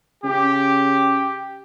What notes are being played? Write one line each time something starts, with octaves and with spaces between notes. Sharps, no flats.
C#3 G4